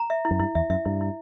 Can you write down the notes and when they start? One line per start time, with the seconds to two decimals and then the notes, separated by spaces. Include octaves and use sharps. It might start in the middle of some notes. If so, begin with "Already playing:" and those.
Already playing: A#5
0.10 E5
0.25 E4
0.31 F#2
0.40 G2 E4
0.55 E2 E5
0.70 F#2 E5
0.85 G2 E4
1.01 E4